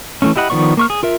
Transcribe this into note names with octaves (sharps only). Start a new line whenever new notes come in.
E3 A3 C#4
E4 G4 D#5 F#5 B5
D#3 F3 B3 D5 C#6
A#3 C#6 F6
G#4
F4 A#4 E5